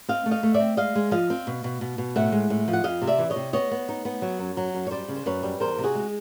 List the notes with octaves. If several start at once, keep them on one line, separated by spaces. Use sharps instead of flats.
C4 D#5 F5
A3
D#5 F5
A3
D5 E5
C4
G#3 D#5 F5
G#3
F3 D#5 F5
C4
B2
B2
B2
B2
A2 E5 F#5
G#3
A2
F3
F#5
F2 D#5 F5
C3
D5 E5
E3
C#5 D#5
C3
B3 C#5 D#5
B3
D#4
B3
F#3
F#2
F#3
F#2
C#5
G3 C5 D5
C#3
C5
F#2 B4 C#5
G3
E2 A#4 C5
C3
F#4 G#4
G#3